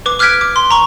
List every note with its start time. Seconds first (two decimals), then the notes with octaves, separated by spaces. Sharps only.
0.06 B4 D6
0.19 D6 F6 F#6 G#6 B6 D7
0.41 D6
0.56 C6
0.71 A#5 C#6